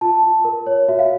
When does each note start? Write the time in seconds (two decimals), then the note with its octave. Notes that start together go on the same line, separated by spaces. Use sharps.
0.01 F4 A5
0.23 F4
0.45 A#4
0.67 C#5
0.89 F#4 E5
0.99 F5